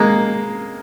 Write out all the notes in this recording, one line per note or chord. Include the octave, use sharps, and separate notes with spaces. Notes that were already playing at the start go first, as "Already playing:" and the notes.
Already playing: G#3 A#3